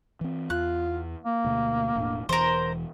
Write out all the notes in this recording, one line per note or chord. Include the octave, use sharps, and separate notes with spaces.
E3 C4
E2 F4 F#6
A#3
D2 B2 A3
E1 A2 D4
E1 E3 A#4 C5